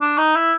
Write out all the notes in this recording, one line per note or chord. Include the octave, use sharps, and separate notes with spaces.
D4
D#4
E4